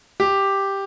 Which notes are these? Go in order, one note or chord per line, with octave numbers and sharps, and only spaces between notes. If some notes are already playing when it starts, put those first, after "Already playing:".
G4